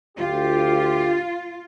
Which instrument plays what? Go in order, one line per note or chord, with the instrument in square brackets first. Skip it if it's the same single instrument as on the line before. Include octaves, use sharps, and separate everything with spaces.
[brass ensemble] D2 G4 [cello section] F4